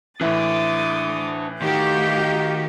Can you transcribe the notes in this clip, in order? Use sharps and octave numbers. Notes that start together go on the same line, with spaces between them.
A2 E3 D4 E5 D6 D#6 A6
D#3 A3 F#4 G4 F5 G6